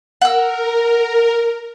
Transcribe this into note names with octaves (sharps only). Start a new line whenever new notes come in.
A#4 F#5 E6